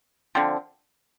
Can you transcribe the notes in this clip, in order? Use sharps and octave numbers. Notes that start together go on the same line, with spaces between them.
D3 F3 C4